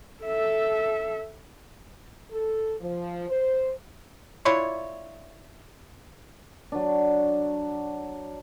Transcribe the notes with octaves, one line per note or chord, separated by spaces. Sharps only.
A4 E5
A4
F3
C5
D4 E4 F4 C#5
F#3 D4